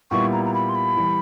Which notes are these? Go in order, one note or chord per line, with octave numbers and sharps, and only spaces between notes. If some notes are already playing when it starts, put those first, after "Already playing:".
A#2 G3 B3 E4 C#6
A#5
A#5
B5
C6
B5
E3 G3